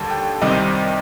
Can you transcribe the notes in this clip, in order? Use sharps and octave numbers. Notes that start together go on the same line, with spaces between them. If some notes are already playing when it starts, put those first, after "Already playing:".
Already playing: D#2 D3 G3 A5
G5
C2 C3 D#3 G3 C4 D#5